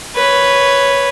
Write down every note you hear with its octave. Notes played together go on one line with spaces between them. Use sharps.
B4 C#5